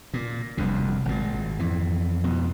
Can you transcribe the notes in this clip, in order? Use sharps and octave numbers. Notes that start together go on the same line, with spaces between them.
A#2
F1 C2 F2 D3
G#1 A#2
F2 E3
F2 B2